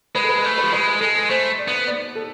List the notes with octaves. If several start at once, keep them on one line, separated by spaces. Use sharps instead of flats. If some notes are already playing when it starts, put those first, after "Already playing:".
G#3 B4
A4
B4
A3
B4
F3
G#3 B4
G#3 A4
A3 C5
D5
B3
D5
A4